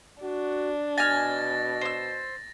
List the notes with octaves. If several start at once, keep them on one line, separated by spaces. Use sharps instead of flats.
D4 F#4
B2 G#5 F6 A6 A#6
C5 E6